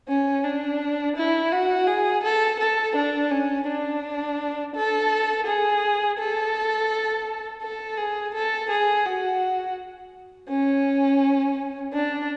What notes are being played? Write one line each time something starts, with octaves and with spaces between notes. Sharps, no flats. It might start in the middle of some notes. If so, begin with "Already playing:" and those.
C#4
D4
E4
F#4
G#4
A4
A4
D4
C#4
D4
A4
G#4
A4
A4
G#4
A4
G#4
F#4
C#4
D4